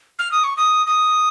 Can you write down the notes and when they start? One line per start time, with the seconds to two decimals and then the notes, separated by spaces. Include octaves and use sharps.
0.19 F6
0.32 D#6
0.44 C#6
0.57 D#6
0.87 D#6